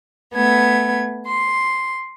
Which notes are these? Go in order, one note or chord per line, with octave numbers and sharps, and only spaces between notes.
A3 B3 G#6
C6